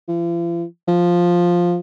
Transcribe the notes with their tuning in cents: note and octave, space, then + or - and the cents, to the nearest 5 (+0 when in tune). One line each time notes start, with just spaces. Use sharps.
F3 -45
F3 +5